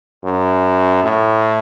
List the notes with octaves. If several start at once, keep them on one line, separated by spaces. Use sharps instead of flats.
F#2
A2